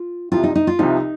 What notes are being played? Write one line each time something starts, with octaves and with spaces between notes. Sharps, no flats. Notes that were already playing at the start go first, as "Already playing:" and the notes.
Already playing: F4
C2 C3 F3 F4
D#4
D#4
F4
C2 C3 F3 D#4